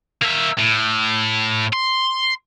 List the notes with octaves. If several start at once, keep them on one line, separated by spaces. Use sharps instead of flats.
A#3 E5
A2
C6